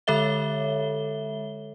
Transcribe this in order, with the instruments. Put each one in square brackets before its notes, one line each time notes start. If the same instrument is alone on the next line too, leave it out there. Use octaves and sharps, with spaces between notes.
[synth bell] D3 G#3 A4 C#5 E5 G7